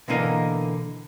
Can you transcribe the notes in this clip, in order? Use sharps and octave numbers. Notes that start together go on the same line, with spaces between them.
B2 D3 E3 A#3 D#4 F5